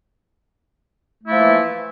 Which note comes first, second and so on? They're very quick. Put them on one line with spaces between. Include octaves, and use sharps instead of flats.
A3 E4 F3 A#3 E3